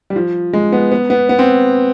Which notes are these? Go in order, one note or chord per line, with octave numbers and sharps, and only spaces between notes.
G3
F3
G#3
B3
B3
B3
B3
C4